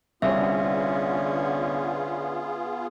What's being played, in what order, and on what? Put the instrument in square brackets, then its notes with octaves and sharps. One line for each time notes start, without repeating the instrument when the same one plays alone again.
[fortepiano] C2 [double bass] D3 C#4 [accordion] B3 F4 G#4 [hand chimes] E5